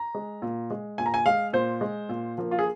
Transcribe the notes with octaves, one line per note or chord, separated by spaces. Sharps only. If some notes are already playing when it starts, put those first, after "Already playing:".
Already playing: A#5
G#3
A#2
G#3
A#2 G#5
A#5
G#5
G#3 F5
A#2 C5
G#3
A#2
F3 A#3
F4
G#4